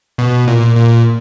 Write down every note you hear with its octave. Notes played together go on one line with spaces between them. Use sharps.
B2
A#2
A#2